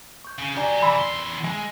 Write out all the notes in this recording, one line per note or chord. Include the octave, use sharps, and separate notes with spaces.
C#6 G6
C#3
F#3 G4 D5 G#5 A#5
C3 E3 B5 E6
E2 C6
G#3 G#5